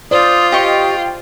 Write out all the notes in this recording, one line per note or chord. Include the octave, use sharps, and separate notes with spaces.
F4 C5 D5 D#6
G4 D#5 G5 C#6